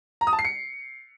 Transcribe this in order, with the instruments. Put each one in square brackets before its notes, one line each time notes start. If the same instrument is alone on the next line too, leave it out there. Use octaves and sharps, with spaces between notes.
[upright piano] A#5
D#6
A5
C7
C#7